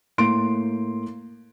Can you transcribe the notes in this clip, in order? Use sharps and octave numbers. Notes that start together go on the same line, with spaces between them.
A2 A#3 C6 D7